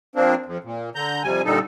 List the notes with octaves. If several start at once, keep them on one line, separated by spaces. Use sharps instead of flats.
F3 A#3 C4 D4
F2
A#2
D3 A#5 G6
F2 C3 G3 G#5
A#2 D3 G3 D#4 A4